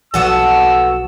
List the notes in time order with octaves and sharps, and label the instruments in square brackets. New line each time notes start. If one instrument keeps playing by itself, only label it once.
[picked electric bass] B1 F3 [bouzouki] B3 F#4 A4 [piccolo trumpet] E6